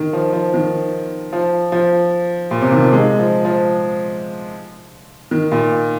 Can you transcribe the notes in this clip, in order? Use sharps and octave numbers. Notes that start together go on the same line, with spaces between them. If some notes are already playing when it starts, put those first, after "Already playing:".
Already playing: D#3
F3
F3
D#3
F3
F3
A#2
C3
D#3
F3
G#3
F3
F3
D#3
A#2